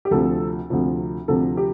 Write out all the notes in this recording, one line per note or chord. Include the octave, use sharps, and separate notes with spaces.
G4
D2 C3 F3 A4
D2 C3 F3
D2 C3 F3 A4
G4